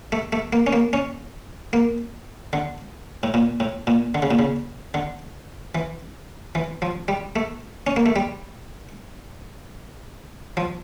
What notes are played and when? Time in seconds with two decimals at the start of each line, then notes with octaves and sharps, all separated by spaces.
0.12 A3
0.33 A3
0.53 A#3
0.67 C#4
0.73 A#3
0.93 C#4
1.73 A#3
2.53 D3
3.23 A2
3.34 A#2
3.60 A2
3.87 A#2
4.15 D3
4.22 C#3
4.31 A#2
4.39 C#3
4.94 D3
5.75 E3
6.55 E3
6.82 F3
7.08 G3
7.36 A3
7.87 C#4
7.96 A#3
8.06 A3
8.16 G3
10.57 F3